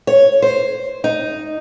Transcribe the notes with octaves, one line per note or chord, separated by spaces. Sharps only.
C#5
C5
D#4